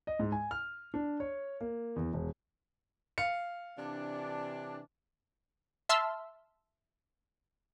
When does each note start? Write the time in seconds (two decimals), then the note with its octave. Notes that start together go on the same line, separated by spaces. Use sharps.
0.07 D#5
0.19 G#2
0.32 G#5
0.51 F6
0.94 D4
1.20 C#5
1.61 A#3
1.96 E2
2.13 E1
3.18 F5 C#7
3.78 C3 E3 D4
5.89 E5 A5 C6 E6 F6